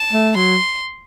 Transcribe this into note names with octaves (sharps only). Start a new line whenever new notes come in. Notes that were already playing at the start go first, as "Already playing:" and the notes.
Already playing: A5
A3
F#3 C6